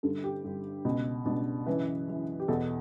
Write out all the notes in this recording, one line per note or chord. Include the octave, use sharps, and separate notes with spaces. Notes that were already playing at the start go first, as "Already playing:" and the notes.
G2 D3 A4
G4
G2 D3
C#2 B2
C#2 B2 D4
F#2 C#3 E3 B4
F#2 C#3 E3
G4
E2 B2 A4